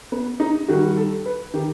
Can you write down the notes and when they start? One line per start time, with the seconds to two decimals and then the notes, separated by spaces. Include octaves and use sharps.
0.12 B3
0.40 D#4
0.68 D#3 G3 F#4
0.97 A4
1.26 B4
1.54 D#3 G4